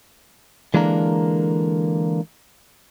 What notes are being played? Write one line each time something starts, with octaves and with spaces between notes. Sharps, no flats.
D3 E3 G#3 A#3 D4 A#4